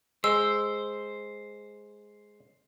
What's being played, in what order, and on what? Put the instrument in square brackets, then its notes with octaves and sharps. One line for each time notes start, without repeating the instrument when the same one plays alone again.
[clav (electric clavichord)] G#3 [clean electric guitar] C5 [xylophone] E6